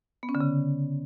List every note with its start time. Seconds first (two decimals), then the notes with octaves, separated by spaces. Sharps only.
0.23 B3
0.29 C#4
0.35 D3
0.40 C#3